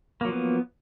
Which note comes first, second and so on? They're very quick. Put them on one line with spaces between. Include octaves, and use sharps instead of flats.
A#3 F#3 F3 B3